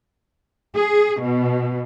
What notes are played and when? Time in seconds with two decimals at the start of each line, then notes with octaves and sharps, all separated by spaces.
0.74 G#4
1.21 B2